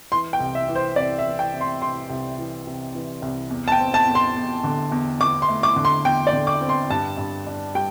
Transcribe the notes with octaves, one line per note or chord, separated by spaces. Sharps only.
E3 C6
G5
C2
E5
E3
C5
C2 D5
E5
E3
G5
C3
C6
C3 C6
C2
E3
C3
E3
C2
E2
A5
G5
C4
A5
E2
C6
E2
D3
E2
E2 D6
C6
A3
D6
D3
C6
E2 G5
D5
D3
D6
C4
C6
G2 A5
G2
D4
G3 G5